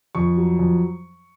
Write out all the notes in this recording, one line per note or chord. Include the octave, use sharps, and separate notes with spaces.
F2 C#6
F#3
F2